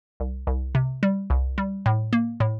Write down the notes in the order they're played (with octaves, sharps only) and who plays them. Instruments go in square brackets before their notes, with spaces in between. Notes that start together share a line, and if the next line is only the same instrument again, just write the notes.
[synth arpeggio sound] C2
C2
C3
G3
C2
G3
A2
A#3
A2